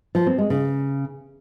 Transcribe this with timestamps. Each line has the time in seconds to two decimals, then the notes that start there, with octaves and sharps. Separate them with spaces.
0.15 F3
0.27 C4
0.38 G#3
0.50 C#3